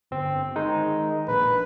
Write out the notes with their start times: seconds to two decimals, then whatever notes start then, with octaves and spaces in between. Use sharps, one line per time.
0.11 G1 C4
0.55 D#3 G#3 D#4
1.28 A#1 B4